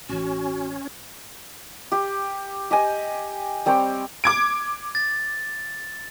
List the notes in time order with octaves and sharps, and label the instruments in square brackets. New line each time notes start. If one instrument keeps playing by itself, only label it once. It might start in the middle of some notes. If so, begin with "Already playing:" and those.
[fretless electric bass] A1 E3 [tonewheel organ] C#4 [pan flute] F#4
[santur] G4
G4 D#5 G#5
G3 C4 C#5 G5
[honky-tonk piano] D6 G#6 D7
[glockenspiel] A6